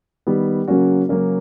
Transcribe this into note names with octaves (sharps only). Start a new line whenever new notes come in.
D#3 G3 B3
C#3 F#3 A#3 C#4 F#4
C#3 F#3 A#3 C#4 F#4